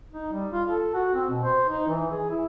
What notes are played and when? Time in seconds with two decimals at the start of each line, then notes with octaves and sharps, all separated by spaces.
0.12 D#4
0.32 G3
0.53 F4
0.68 A4
0.94 F#4
1.14 C4
1.30 B2
1.43 C5
1.69 D#4
1.88 E3
2.11 G#4
2.30 E4